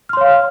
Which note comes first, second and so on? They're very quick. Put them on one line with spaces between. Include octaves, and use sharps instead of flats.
F6 C6 C#5 F5